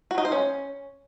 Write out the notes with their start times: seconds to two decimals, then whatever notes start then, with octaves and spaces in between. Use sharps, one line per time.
0.11 F#4
0.18 D#4
0.25 C5
0.32 C#4